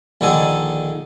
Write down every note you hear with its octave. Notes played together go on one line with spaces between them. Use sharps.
A#1 D3 D#3 D#4 A4 G#5